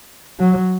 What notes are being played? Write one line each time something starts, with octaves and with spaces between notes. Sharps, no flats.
F#3